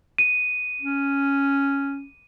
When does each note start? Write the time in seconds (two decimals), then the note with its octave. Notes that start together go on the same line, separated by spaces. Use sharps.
0.18 D#7
0.82 C#4